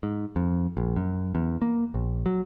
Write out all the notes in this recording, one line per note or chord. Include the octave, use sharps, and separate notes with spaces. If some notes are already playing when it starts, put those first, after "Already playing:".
G#2
F2
A#1
F#2
E2
A#3
A#1
F#3